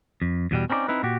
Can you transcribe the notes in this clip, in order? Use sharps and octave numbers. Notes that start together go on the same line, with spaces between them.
F2
E2 B2 G3
C4 C#4 D#4 A#4 D5
C4 D#4 E4 B4
A#2 F#4 G4